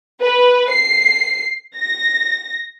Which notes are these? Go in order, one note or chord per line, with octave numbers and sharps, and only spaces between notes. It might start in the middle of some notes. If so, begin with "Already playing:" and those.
B4
C7
A#6